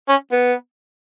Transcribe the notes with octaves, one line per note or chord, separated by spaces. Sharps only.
C#4
B3